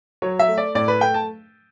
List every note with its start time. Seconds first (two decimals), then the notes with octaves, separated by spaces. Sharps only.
0.22 F#3 C#5
0.39 E5
0.48 A3
0.58 D5
0.75 A2 D5
0.88 B4
1.01 A3 G5
1.14 A5